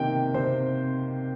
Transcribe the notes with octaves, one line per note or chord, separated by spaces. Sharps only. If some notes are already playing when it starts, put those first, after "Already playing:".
Already playing: C3 D#3 A#3 G5
C3 C5